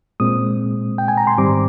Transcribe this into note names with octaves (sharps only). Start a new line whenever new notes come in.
A#2 G#3 C4 D#6
G5
G#5
A#5
C6
G#2 D#3 G3 C4 D6